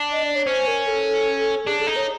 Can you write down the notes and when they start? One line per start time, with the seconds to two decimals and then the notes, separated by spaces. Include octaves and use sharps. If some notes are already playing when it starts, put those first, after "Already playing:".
Already playing: D4
0.12 D#5
0.24 D5
0.35 C#5
0.47 C#4 C5
0.67 A#4
0.87 A4
1.66 D4 G#4
1.81 A4
1.87 D#4
1.96 C#5